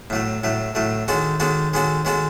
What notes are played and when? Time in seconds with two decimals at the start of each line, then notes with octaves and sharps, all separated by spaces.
0.10 A2 F#3 A3
0.43 A2 F#3 A3
0.75 A2 F#3 A3
1.08 D#3 G#3 C#4 F#4 A4
1.40 D#3 G#3 C#4 F#4 A4
1.73 D#3 G#3 C#4 F#4 A4
2.05 D#3 G#3 C#4 F#4 A4